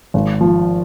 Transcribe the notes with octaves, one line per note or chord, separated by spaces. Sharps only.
G#1
F3